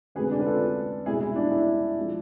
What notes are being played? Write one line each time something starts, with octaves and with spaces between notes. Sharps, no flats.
D2 C3 G#3 G#4 B4
D4
B4
F4 A4
C2 B2 G#3 E4 G#4
E4
D4
E4
F3 G#3